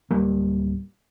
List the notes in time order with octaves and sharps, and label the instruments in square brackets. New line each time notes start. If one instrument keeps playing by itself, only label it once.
[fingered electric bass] D1 G3 A#3